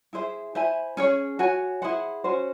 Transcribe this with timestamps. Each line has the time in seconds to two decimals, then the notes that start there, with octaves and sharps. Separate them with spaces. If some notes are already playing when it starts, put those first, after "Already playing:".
0.13 E4 G#4 C5 E5
0.55 E4 C5 E5 G#5
0.97 C#4 G#4 C#5
1.39 F#4 C#5 G#5
1.82 E4 G#4 C5 F#5
2.24 C#4 F#4 C5